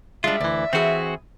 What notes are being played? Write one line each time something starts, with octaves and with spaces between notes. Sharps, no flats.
G3 G#3 D4 F4 E5
D2 E3 D5
E3 C4 F#4 G#4